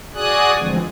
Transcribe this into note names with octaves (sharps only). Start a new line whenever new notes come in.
F#4 G#4 D5 G#5 D#6 F#6
D2 D3 E3 F3 G#3 C4